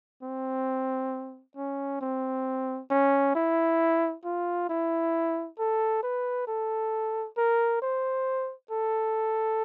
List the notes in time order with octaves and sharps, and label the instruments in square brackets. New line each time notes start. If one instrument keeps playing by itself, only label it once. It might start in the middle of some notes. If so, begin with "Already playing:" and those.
[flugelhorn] C4
C#4
C4
C#4
E4
F4
E4
A4
B4
A4
A#4
C5
A4